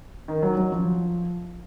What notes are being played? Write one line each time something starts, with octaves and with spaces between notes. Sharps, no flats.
D#3
F#3
F#3
F3